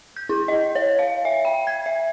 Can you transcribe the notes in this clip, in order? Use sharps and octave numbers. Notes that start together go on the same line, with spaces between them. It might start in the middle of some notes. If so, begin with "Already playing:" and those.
G6
E4
D#5
C#5
F5
E5
G5
G#6
E5